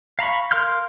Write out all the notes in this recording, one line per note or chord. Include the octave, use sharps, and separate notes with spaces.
F5 A#5 B5 C#6
A#4 F5 C6 F6 G6